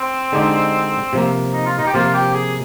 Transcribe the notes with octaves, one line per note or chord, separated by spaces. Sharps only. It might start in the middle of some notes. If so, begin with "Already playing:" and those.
Already playing: C4
D3 G#3 D#4 G4 D5
C3 F3 A#3
D#4
F4
D#4
G4
C3 F3 A#3 F4
G4
G#4